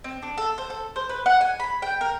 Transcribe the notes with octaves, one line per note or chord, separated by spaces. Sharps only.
C4
D4
A4
C5
A4
C5
B4
F#5
G#5
B5
G5
A#4